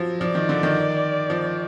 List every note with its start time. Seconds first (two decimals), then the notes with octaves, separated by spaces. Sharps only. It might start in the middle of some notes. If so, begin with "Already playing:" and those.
Already playing: F3 F#3
0.21 F3 D5
0.35 D#3
0.49 D3
0.63 D#3
1.30 F3